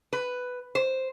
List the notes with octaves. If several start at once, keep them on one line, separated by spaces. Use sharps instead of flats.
B4
C5